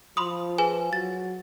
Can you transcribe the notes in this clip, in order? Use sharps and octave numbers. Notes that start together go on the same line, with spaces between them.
F3 B5 C6 D#6
G#4 B4 G#5
F#3 A6